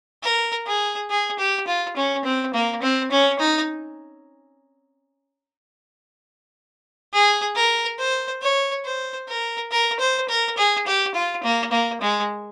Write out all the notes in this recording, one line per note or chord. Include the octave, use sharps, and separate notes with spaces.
A#4
G#4
G#4
G4
F4
C#4
C4
A#3
C4
C#4
D#4
G#4
A#4
C5
C#5
C5
A#4
A#4
C5
A#4
G#4
G4
F4
A#3
A#3
G#3